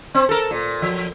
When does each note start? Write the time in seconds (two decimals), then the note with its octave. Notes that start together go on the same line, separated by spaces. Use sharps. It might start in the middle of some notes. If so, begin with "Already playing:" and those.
0.14 C4
0.29 A4 A#4
0.51 A#2
0.82 F3